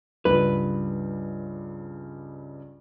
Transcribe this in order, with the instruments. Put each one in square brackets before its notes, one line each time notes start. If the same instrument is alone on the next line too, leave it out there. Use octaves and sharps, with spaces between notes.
[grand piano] C#2 G2 [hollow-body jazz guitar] B4